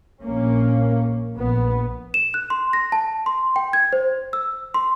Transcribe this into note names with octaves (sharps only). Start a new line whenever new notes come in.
A#1 A#3 C#4
A#1 B3
E7
F#6
C6
A#6
A5
C6
G5
G#6
C5
E6
C6